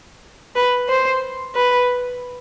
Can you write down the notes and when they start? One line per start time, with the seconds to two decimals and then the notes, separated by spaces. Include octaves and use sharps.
0.55 B4
0.89 C5
1.55 B4